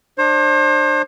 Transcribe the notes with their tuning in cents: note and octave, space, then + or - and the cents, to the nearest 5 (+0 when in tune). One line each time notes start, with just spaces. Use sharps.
D4 +30 C5 +35